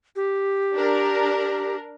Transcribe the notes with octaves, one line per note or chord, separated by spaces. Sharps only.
G4
D4 A#4